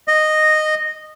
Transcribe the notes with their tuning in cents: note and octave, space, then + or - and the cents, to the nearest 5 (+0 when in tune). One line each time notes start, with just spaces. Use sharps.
D#5 -10